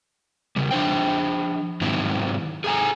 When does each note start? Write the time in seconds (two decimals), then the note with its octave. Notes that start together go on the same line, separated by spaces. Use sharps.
0.56 C#3 G3
0.71 F3 D4 C5 G5
1.81 G#2 D#3 F#3 C4 E4
2.64 G#4 A4 E5 G#5 A#5